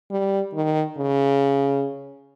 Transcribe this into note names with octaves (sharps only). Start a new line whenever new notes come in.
G3
D#3
C#3